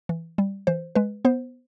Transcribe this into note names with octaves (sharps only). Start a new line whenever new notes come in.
E3
G3
E3 C5
G#3 B4
B3 C5